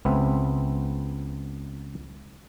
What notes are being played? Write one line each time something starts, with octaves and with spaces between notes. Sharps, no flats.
C#2 B3 C4 E5